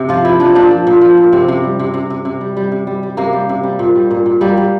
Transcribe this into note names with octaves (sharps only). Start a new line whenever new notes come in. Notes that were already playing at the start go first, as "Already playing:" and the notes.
Already playing: C3
F3 F4
F3 E4
F3 D4
A#2 D4
F3
A#2
F3
A#2
C3 C4
C3
G3
C3
C3
C3
C3
G3
G3
C3
G3
G3
C3 A#3
G3
C3
G3
A#2
G3
A#2
A#2
G3 A#3
G3